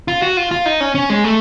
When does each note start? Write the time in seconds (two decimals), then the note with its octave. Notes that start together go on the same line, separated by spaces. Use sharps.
0.08 F4
0.22 F#4
0.37 F4
0.51 F4
0.66 D#4
0.80 C#4
0.95 C#4
1.10 G#3
1.24 A3